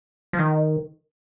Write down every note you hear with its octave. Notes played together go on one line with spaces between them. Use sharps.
F3
D#3